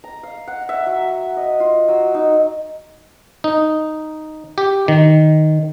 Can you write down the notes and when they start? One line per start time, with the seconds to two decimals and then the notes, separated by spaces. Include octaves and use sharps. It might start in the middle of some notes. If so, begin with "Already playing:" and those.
0.04 A#5
0.23 F5
0.48 F#5
0.69 E5
0.86 F#3
1.37 D#5
1.60 F4
1.88 F#3
2.14 D#4
3.44 D#4
4.58 G4
4.88 D#3